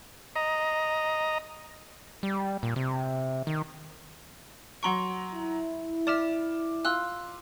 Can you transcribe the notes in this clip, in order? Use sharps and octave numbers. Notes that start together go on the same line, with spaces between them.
D#5 A#5
G3
A#2
C3
D#3
F#3 F#5 A#5 C6 C#6 D7
E4
D5 E5 D6 F6 E7
F4 C6 E6 F#6